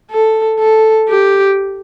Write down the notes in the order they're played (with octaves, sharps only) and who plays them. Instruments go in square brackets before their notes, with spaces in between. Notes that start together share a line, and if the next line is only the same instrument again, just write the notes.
[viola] A4
A4
G4